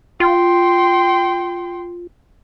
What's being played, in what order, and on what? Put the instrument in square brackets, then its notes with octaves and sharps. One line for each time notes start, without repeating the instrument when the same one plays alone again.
[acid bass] F4 [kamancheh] G5 C6